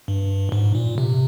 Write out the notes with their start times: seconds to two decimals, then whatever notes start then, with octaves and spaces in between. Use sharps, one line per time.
0.08 G2
0.52 G#2
0.75 A#2
0.98 C3